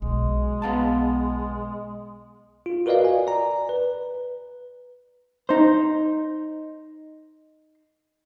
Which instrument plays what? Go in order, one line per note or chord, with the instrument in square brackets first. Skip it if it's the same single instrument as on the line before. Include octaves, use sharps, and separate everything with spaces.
[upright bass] B1 [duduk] G#3
[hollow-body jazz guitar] B3 F5 A5
[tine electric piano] F4
F#4 A#4 B4 D5 D#5 F5
G#5
D5 A#5
B4
[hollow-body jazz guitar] D#4 C5